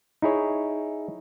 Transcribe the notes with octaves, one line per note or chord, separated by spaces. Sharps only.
D#4 E4 G#4 C#5